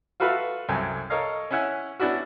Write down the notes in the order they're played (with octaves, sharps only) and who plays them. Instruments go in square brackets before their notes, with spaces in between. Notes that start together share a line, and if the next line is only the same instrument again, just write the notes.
[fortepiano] F4 F#4 A4 B4 E5 F5
C2 F#2 A4 G5 G#5
A4 A#4 C#5 D#5 F5
C#4 E4 E5 F#5 G#5
B3 C#4 D4 E4 F#4